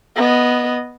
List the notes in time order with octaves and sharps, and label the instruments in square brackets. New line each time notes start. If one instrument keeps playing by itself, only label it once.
[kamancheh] B3 D#5